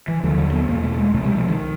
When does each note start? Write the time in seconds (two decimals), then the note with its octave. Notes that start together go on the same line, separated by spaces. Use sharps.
0.08 E3
0.23 D#2 D3 F3
0.38 F#3
0.53 B3
0.68 E2 B2 A#3
0.84 A3
0.98 G#3
1.13 C2 B2 A3
1.21 G#3
1.25 G3
1.36 F3
1.48 D#3